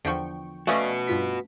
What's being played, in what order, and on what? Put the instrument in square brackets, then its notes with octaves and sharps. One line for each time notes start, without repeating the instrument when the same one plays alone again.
[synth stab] E2 G5 C#6 [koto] D3 F3
[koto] A3 C#4 [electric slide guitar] F#4 B4 [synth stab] D5 D#5 F5
[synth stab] G2 F4 B6